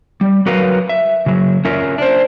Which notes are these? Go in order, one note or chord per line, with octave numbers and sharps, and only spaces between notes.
G3
F#3 F#4 A#4 B4 F5
E5
C#3 F#3
C#4 F4 A#4 E5
D4 C5